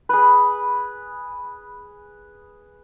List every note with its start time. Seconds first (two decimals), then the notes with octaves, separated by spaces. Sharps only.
0.09 G#4 B4